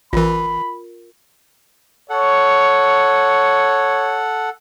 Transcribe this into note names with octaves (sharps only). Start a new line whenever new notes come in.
A1 E3 F4 A#4 B5
A4 C#5 F#5